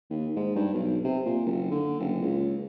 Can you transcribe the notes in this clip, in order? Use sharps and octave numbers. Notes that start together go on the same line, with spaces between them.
D#2
G#2
G2
B1
C3
A#2
F#1
D3
F#1
C#2